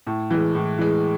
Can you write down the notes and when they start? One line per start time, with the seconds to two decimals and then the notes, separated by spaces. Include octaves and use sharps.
0.07 A2
0.30 E3 G#3
0.55 A2
0.79 E3 G#3